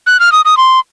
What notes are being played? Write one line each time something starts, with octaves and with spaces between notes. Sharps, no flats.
F#6
F6
D#6
D#6
C6